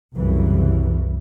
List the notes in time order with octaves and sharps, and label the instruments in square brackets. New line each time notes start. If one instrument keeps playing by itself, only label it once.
[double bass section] C2 F#2 C#3 E3